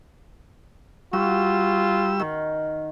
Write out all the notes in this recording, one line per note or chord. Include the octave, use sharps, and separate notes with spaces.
G3 F4 F#4 E6
D#3